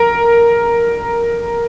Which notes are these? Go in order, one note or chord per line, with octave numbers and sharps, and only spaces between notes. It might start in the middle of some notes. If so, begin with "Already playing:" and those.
Already playing: A#4